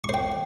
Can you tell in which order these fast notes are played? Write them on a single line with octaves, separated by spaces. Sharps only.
C#6 C5 G5